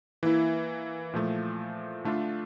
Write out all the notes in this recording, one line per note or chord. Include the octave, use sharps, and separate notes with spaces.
E3 A#3 E4
A#2 F3 A3
D3 A3 D4 F4